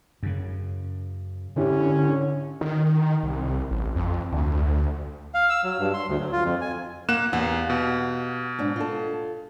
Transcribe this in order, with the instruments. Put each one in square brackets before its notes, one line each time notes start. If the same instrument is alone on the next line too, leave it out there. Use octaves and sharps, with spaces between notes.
[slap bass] F#2 C#3
[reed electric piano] G#2 E4 G4 [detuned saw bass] D3 [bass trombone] C#4
[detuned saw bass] D#3
C2
A1
F2
D2
[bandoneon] F5
E6
F#3
G2
C6
D2
F#3
F4
F2
G#5
[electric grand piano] A#3 F#6 E7 [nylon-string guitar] F#5
[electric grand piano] E2 [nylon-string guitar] G4 F5 F#5
[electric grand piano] B2
[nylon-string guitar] G#2 D4
F4 A4